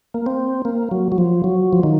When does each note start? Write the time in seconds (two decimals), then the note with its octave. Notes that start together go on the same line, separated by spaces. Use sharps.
0.14 A#3
0.26 C4
0.65 A#3
0.91 F#3
1.12 F#3
1.18 F3
1.44 F#3
1.73 F3
1.83 D#3